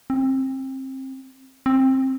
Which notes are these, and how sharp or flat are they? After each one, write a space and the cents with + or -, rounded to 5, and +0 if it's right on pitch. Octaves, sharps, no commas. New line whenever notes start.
C4 +25
C4 +15